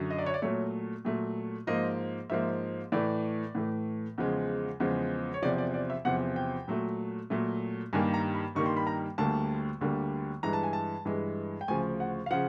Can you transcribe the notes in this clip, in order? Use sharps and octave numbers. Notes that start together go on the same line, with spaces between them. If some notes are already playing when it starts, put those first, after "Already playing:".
Already playing: F#2 D3 F#3
D#5
D5
C#5
D5
A#2 F#3 A3 C#5
A#2 F#3 A3
G#2 F3 A#3 D#5
G#2 F3 A#3 E5
A2 E3 A3 D5
A2 E3 A3
E2 C#3 F3 G#3
E2 C#3 F3 G#3
C#5
E2 C3 F3 D5
D5
D5
E5
E2 C3 F3 F#5
G5
A#2 F#3 A3
A#2 F#3 A3
G2 D#3 G3 A#3 G#5
A#5
B5
G2 D#3 G3 A#3 C#6
C6
B5
A#5
D2 D3 G3 A#3 A5
D2 D3 G3 A#3
G2 E3 G#3 A#5
A5
G#5
A5
G2 E3 G#3
G5
D2 C#3 F3 G#5
F#5
F5
C#3 F3 F#5